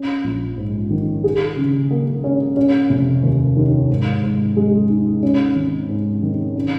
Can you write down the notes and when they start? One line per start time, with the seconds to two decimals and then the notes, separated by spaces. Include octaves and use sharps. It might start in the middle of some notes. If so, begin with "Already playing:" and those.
Already playing: C#4
0.24 A#1
0.57 G#2
0.90 D#3
1.24 G#4
1.57 C#3
1.91 A#3
2.24 C#4
2.57 C#4
2.90 F1
3.23 D#2
3.57 D#3
3.90 G#2
4.23 G#2
4.57 G#3
4.90 D#4
5.23 C#4
5.56 G#1
5.89 G#2
6.23 D#3
6.56 C#4